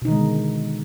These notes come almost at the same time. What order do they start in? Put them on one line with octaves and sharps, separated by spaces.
B2 D#4 D#3 G#3 D3